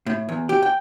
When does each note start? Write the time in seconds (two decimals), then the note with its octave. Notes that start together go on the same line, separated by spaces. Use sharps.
0.06 A2
0.29 E2
0.49 G4
0.62 G5